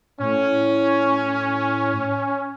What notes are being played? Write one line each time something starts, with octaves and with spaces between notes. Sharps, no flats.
A2 C#4